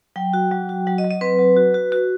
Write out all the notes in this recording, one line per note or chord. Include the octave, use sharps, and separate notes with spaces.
F#3 G5
F#4
F#3
F#4
F#3 F#5
D#5
F#3
D#5
C4 B4
F#3
F#4
F#4
F#4